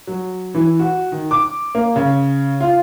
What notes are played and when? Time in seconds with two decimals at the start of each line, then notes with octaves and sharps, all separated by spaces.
0.07 F#3
0.54 E3
0.80 F#4
1.12 D#3
1.31 D6
1.75 A#3
1.96 C#3
2.60 F4